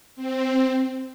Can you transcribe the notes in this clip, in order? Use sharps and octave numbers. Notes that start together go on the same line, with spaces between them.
C4